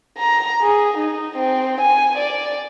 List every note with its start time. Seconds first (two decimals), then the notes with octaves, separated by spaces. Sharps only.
0.18 A#5
0.62 G#4
0.98 D#4
1.37 C4
1.81 G#5
2.18 D5